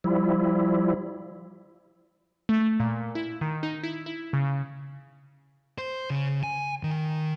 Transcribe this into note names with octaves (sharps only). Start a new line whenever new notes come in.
F3 G3 E4
A3
A#2
E4
D#3
D#4
E4
E4
C#3
C5
C#3
G#5
D#3